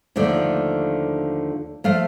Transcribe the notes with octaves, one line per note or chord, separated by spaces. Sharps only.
D#2 D3 F3 A3 D5
F3 A3 F5